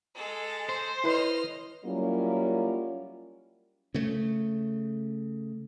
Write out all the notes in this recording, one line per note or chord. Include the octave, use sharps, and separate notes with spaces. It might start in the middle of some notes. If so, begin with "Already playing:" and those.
G#3 A4
C5
E4 B4 C#5 D#5 F6
F#3 G3 A#3 C#4 E4 F4
C#3 A3